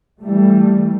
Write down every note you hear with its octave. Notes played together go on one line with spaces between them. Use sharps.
E3 G3 A3